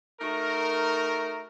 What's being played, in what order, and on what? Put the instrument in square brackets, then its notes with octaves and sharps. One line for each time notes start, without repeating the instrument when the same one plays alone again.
[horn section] A3 D#4 F#4 A#4